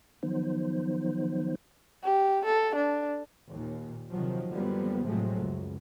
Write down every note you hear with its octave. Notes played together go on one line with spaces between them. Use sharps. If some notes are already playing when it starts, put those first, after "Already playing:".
D#3 F3 F#3 B3 D#4 C5
G4
A4
D4
D#2 A#2
C3 D#3 F3 F#3
F#2 D3 F3 G3 A#3 B3
A2 C3 F3 F#3 G#3 A3
C#2 F#2